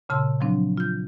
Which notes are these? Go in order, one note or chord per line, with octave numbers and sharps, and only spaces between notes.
A#2 C#3 A5 C6 E6
F3 F#3 C4 D4
F4 G6